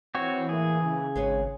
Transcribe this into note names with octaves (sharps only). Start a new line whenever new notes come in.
E3 C4 F#4 C#5
A2 A#3 E4 G#4
C#3
G#1 G#3 B4 C#5